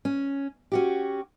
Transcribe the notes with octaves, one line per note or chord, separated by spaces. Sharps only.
C#4
C#4 F#4 G4